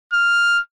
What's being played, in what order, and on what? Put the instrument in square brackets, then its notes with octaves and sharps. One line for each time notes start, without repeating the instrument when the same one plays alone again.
[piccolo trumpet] F6